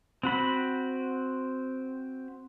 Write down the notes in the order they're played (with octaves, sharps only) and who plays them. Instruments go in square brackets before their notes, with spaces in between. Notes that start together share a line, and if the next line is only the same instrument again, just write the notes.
[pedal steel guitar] C4 F#4 B5